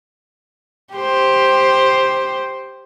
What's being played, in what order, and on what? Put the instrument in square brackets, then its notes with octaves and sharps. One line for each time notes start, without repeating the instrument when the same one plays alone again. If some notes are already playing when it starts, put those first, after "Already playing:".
[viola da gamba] G4 C5